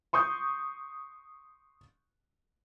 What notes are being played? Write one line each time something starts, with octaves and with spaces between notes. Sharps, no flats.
C6 C#6 D#6 G6